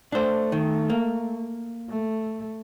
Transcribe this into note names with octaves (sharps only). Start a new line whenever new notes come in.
A3 D4 C5
D#3
A#3
A3